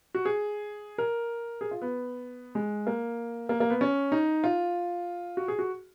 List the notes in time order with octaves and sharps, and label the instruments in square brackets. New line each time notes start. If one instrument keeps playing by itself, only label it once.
[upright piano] F#4
G#4
A#4
G#4
F4
B3
G#3
A#3
A#3
A#3
B3
C#4
D#4
F4
F#4
G#4
F#4